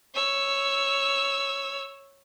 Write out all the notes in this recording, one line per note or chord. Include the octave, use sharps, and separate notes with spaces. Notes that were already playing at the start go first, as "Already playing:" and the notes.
C#5 E6